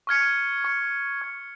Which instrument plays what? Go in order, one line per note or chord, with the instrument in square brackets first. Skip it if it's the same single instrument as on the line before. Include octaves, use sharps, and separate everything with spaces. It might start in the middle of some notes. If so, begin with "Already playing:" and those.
[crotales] C#6 F6 G#6 C#7
C#6 F6 G#6 C#7
C#6 F6 G#6 C#7